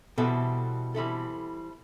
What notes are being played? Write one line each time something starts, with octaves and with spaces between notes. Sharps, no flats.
B2 E3 G3 C4 E4 A4
E3 G3 C4 E4 A4